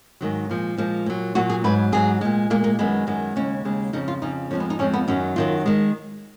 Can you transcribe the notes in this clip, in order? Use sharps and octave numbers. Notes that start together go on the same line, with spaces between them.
G#2 D#3 F#3
A#2 F3 G#3
A#2 F3 G#3
A#2 F#3
A#2 F#3 F#4
G#4
G#2 F#3 B4
G#2 F#3 G#4
A#2 G#3
A#2 G#3 A#3
A#3
F#2 D#3 G#3 B3
F#2 D#3 G#3
D#2 C#3 G#3 C#4
D#2 C#3 G#3
F2 C#3 F3 D#4
F4
F2 C#3 F3 D#4
F2 F3 G#3 C#4
B3
D#4
F2 F3 G#3 C#4
B3
F#2 D#3 F#3 C#4
F#2 D#3 F#3 F4
D#3 G#3